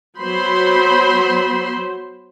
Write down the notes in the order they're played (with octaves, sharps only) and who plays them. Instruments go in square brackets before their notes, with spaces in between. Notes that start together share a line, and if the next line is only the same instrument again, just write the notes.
[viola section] F#3 B3 C5 B5 C6